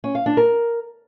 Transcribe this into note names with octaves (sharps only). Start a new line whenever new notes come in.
C#4
F5
D4
A#4